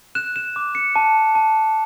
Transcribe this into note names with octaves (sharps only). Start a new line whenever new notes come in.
F#6 E7
E7
D6
C#7
A5
A5